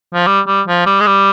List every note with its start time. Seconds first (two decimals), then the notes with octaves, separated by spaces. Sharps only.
0.14 F3
0.27 G3
0.48 G3
0.68 F3
0.86 G3
1.00 G#3
1.07 G3